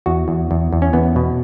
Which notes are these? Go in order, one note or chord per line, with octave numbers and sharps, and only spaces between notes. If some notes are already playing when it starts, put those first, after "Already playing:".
E2 F#4
E2
E2
E2
C#4
E2 B3
B2